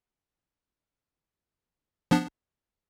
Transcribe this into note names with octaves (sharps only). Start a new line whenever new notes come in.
F3 B3 D4